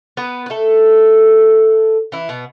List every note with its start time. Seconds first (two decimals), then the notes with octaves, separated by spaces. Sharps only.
0.17 B3 B4
0.46 B4
0.50 A3 A4
2.12 E3 E4
2.29 B2 B3